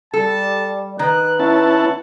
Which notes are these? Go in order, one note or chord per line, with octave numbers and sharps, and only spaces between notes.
G3 A4 A5
D#3 B4 F#6
C#4 E4 F#5 A5